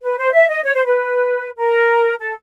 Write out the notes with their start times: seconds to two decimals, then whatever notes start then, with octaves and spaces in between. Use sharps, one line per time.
0.02 B4
0.18 C5
0.33 E5
0.49 D#5
0.64 C#5
0.75 C5
0.85 B4
1.58 A#4
2.19 A4